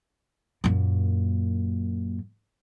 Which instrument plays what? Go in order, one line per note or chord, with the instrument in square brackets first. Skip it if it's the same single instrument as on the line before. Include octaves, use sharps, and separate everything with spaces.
[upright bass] F#2 A#2